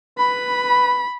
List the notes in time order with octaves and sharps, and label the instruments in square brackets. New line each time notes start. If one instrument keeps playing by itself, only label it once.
[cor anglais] B4 [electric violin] B5